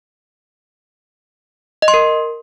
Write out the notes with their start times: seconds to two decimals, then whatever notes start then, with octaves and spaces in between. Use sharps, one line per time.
1.82 D#5
1.88 C6
1.94 A#4